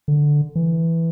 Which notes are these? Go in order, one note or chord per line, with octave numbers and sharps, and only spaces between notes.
D3
E3